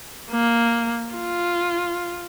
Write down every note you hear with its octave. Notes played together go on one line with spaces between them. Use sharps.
A#3
F4